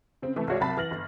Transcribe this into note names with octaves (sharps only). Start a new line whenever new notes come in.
C#3 C4
C3 E3 A3
C2 G#3 F#4 C#5 D5
C2 C3 F#3 A5 B5 A6
E3 F6 A#6 F#7
G1